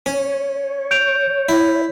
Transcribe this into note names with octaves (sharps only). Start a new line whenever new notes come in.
C#4 C#5
G6 D7 F7
E4